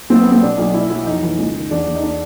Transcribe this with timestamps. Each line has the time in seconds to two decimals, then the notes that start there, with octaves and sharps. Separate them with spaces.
0.10 B1 C4
0.20 B3
0.26 F#3
0.32 C4
0.42 B2 D4
0.58 B1
0.74 B2 E4
0.90 F#3 E4
1.06 F2 D#4
1.23 E3
1.38 C#2
1.55 D#3
1.71 E2 D4
1.87 E2
1.95 D#4
2.03 D4